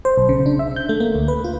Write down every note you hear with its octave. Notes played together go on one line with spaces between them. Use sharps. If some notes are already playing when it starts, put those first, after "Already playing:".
C5
B1
C#3
D4
E5
G6
A3
A#3
D2
B4
F4